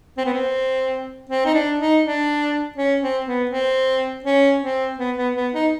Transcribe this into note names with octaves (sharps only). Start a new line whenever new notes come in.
C4
B3
C4
C4
D#4
D4
D#4
D4
C#4
C4
B3
C4
C#4
C4
B3
B3
B3
D#4